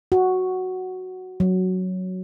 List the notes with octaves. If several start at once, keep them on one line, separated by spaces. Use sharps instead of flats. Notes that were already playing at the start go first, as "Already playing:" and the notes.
F#4
F#3